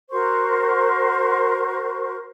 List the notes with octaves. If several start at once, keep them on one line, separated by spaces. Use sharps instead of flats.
F#4 A#4 C5 C#6